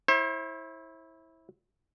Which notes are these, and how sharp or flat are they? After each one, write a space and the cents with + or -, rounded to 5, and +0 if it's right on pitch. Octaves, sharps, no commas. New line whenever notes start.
E4 -15 C5 +40